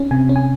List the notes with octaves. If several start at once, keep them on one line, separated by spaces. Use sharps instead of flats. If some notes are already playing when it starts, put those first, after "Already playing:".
Already playing: C#4
C3 G#5
C#4
G#5